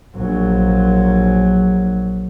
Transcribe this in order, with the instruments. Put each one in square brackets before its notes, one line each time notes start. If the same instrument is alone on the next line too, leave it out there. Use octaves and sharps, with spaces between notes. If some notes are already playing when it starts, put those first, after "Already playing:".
[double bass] A#1 F#3